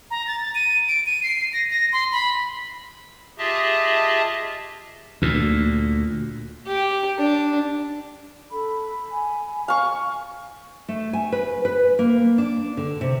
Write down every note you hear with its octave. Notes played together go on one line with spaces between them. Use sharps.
A#5
A6
D#7
D7
D#7
C7
A#6
A#6
C6
B5
F4 G4 G#4 D#5 E5 A5
D2 A#2
G4
D4
A4 B5
G#5
F5 G#5 C#6
A3
G#5
B4
B4
A#3
D4
D3
C3